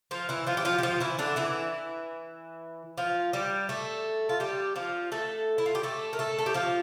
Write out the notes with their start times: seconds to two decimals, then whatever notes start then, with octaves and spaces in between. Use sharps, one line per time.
0.11 F3 F4
0.29 E3 E4
0.47 F3 F4
0.57 G4
0.65 F3 F4
0.78 G4
0.83 F3 F4
1.00 E3 E4
1.19 D3 D4
1.36 E3 E4
2.98 F3 F4
3.33 G3 G4
3.69 A3 A4
4.29 F4
4.40 G3 G4
4.76 F3 F4
5.12 A3 A4
5.58 E4
5.66 F4
5.75 G4
5.83 A3 A4
6.13 A#4
6.19 A3 A4
6.38 A4
6.46 G4
6.54 F3 F4